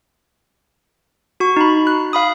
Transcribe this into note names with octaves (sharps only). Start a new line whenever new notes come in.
F#4 C#6
D#4 B5
F#6
F5 B5 D#6